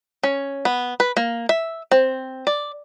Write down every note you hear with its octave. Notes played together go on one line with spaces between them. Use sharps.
C#4
B3
B4
A#3
E5
C4
D5